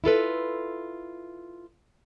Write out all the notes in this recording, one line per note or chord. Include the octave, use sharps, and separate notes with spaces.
E4 F4 A4 B4